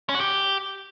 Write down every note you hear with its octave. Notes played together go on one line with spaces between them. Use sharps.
C#4
F#4
G4